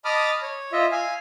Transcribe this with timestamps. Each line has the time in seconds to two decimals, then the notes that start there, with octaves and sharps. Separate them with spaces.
0.05 D#5 A5 B5 D6 D#6 F6
0.42 C#5
0.72 F4 D#5 E5
0.92 F5 G#5